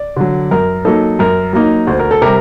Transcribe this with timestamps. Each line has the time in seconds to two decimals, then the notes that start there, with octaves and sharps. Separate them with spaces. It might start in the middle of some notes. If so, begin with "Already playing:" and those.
Already playing: D5
0.16 D3 F#3
0.51 F#2 A#4
0.85 F#3 A#3 D#4 A4
1.19 F#2 A#4
1.53 F#3 A#3 D#4
1.87 D2 C5
1.99 A#4
2.11 A4
2.22 C3 G3 A#4